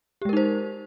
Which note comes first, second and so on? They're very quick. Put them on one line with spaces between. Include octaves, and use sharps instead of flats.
G4 G#3 A#4 D#4 C5